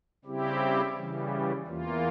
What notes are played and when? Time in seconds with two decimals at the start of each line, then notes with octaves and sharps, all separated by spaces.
0.25 C#3 G3 C4 E4 G4
0.96 C#3 E3 G3
1.66 E2 E3 A#3 F4